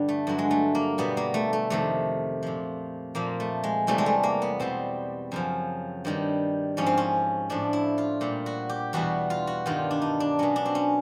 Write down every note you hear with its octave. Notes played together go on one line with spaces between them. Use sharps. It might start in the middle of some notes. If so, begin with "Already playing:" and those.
Already playing: G2 D3 G3
A3
G2 D3 F#3
G#3
A3
A#3
B2 G3 B3
A#3
A3
A3
F2 C3 D#3 A3
A#2 F3
A#2 F3 A#3
A3
G#3
E2 C3 E3 G3 A3
G#3
A3
A#3
B3
B2 G3 C4
F#2 C#3 F3
G2 D#3 G3
G#2 F3 C#4
C4
C#4
A2 F3 D4
E4
F4
A#2 G3
F#4
G4
E2 B2 G3 F#4
F4
F#4
G2 D#3 G3 F4
D4
D#4
D4
B2 F#3 C#4
D4
C4
C#4